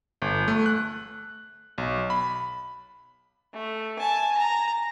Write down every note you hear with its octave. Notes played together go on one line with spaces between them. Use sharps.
G1
A3
F#6
B1
B5
A3
G#5 A5
A#5